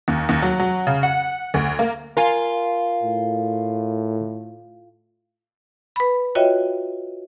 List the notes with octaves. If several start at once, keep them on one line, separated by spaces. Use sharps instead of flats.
D#2
D#2
F#3
F#3
C#3
F#5
D2
A#3
F4 A#4 G#5
A2
B4 B5
F4 F#4 C#5 D#5 E5 G5